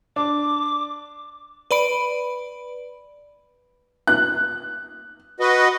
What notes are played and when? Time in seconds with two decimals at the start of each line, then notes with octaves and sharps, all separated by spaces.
0.16 D4 D6
1.71 B4 D5 B5 D7
4.07 F#6
5.40 F#4 B4 D#5